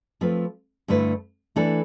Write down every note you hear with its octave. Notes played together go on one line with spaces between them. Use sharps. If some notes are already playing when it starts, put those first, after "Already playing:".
F3 A3 C4 F4 B4
G2 D3 A3 E4 B4
E3 A3 D4 A4